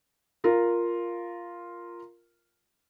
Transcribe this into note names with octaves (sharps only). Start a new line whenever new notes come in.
F4 A#4